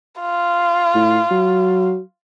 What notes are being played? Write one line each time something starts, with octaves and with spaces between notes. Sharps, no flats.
F4
A2
F#3